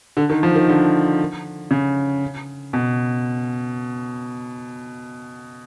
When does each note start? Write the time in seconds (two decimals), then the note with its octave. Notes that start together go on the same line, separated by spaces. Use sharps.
0.17 D3
0.30 D#3
0.43 F3
0.56 D#3
0.69 D3
1.71 C#3
2.73 B2